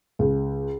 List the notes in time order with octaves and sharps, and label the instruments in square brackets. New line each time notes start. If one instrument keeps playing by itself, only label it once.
[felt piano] C#2